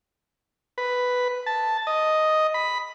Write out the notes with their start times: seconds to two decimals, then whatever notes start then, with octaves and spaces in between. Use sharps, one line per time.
0.78 B4
1.46 A5
1.87 D#5
2.54 B5